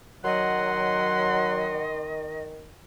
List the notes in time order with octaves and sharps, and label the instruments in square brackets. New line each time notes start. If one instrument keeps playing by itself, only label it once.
[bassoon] D#3 [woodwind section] F#3 F#5 [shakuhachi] D#5 [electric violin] C6